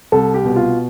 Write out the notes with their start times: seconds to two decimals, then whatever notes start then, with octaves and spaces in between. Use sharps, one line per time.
0.12 C2 A4
0.34 G4
0.45 B2
0.56 F4